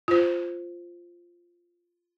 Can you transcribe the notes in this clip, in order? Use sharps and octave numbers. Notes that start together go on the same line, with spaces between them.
F4 C5